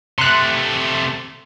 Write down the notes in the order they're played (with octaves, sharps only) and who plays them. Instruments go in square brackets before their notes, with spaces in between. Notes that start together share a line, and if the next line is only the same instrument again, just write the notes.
[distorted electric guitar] C3 A3 [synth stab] C6 F#6